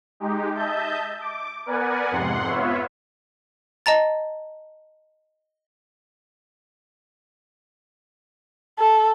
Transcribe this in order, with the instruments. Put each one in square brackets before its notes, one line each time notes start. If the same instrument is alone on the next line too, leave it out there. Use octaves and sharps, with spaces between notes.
[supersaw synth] G#3 D#4 G4
D#5 E5 A5 G6
D6
B3 A#4 B4 D5 F#5 G#5
F2 G#2 C3 F#5 C6
B3 F4 B4 C#5 E5
[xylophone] D#5 A5 A#5 A6
[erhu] A4